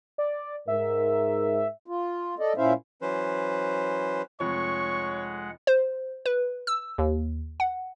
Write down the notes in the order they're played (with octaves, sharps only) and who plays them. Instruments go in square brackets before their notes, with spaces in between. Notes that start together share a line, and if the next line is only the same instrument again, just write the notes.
[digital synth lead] D5
[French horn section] G#2 A#4 [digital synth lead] E5
[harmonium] F4
A4 D5 D#5
A#2 C#4 E4 C5 E5 F5
[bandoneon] E3 F#3 C#4 B4 C5
[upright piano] F1 F2 F3 [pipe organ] G#3 F#5 [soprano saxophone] C#5 [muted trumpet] C#6
[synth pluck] C5
B4
E6
D#2
F#5